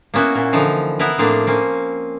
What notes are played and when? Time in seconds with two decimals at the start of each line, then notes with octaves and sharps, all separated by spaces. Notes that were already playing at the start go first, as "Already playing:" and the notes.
0.14 A#3 B3 C#4 E4 F#4
0.35 A#2 E4
0.53 D3 E3 F3 D#4
0.99 B3 E4 G#4 A#4 B4
1.18 A2 F3 A#3 C4 D4 G#4
1.47 A#3 C4 C#4 G#5